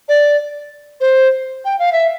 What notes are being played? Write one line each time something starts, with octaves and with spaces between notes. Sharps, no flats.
D5
C5
G5
F5
E5